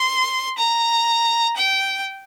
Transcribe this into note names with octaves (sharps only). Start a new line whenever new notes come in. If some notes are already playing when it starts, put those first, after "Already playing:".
Already playing: C6
A#5
G5